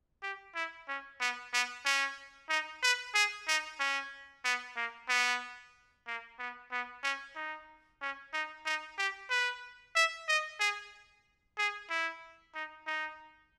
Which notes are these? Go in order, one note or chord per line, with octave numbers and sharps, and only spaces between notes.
G4
E4
C#4
B3
B3
C#4
D#4
B4
G#4
D#4
C#4
B3
A#3
B3
A#3
B3
B3
C#4
D#4
C#4
D#4
D#4
G4
B4
E5
D#5
G#4
G#4
E4
D#4
D#4